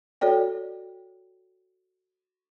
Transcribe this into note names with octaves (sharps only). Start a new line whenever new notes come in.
F#4 A4 C#5 D5 G5